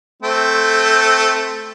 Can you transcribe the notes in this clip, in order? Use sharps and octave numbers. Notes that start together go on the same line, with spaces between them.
A3 C4